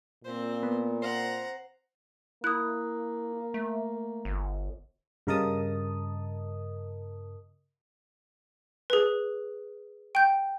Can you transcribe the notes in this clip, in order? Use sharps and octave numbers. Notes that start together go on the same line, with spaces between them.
A#2 C4 C5
B3
C5 F#5 A#5
A#3 E4 D#6 F#6
A3
G1
G2 C#3 A#4 D#5 A5 D#6
G#4 B4
G5 G6